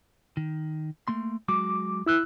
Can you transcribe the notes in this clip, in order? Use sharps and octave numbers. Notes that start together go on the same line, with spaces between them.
D#3
A3 A#3 C6
F#3 G#3 F#4 D6
E4 E6 F#6